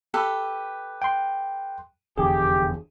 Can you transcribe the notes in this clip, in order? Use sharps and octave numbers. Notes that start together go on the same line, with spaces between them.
G4 A4 B4
G5 C6
F1 E2 D3 G4 G#4